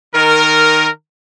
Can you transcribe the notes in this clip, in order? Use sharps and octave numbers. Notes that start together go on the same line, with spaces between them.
D#3 A#4